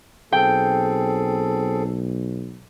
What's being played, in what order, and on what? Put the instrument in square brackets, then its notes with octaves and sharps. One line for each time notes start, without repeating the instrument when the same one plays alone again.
[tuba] B1 [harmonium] C4 G#4 A4 [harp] G5